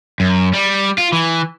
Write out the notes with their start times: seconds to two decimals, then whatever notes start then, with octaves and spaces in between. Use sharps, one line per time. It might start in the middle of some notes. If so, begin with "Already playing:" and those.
0.20 F#2
0.54 G3
0.98 F4
1.13 E3